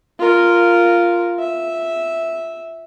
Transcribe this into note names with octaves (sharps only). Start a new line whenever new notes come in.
F4 A#4
E5